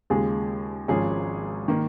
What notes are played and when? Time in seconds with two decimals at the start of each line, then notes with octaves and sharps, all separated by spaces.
0.10 D#2 C#3 G#3 F4 G#4
0.88 G#1 G#2 F3 C#4 G#4
1.68 D#3 A#3